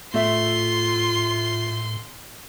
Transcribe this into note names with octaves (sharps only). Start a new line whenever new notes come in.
A2 A3 F4 E5 C6